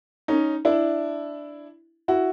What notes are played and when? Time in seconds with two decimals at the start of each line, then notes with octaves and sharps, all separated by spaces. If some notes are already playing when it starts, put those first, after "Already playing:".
0.28 C#4 D#4
0.65 D4 E4
2.08 E4 F#4